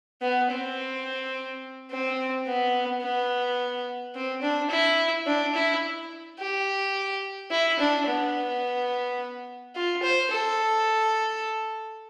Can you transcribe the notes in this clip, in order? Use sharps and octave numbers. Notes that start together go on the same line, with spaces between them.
B3
C4
C4
B3
B3
C4
D4
E4
D4
E4
G4
E4
D4
B3
F4
C5
A4